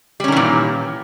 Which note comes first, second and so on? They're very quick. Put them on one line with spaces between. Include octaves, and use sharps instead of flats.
G3 C#4 D#3 E3 A#2